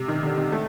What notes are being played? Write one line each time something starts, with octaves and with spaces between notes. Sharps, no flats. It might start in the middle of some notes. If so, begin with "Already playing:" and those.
Already playing: C3
D#3
D3
D#3
A3